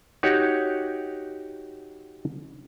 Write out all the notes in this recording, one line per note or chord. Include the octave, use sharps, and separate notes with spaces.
D#4 F#4 G4 C#5 F#5